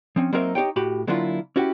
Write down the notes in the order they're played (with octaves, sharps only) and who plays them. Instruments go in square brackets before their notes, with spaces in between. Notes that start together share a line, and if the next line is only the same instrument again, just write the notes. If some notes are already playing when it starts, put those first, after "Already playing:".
[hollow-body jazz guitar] F3 C4 C#4
F#3 A#3 C4 D#4 A#4 E5
D#4 G4 C#5 G5
A2 F#4 G4 B5
D3 F#3 A#3 D4 E4 F4
C#4 E4 F#4 G4